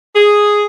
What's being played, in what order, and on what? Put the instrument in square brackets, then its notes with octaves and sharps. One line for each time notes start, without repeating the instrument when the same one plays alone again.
[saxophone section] G#4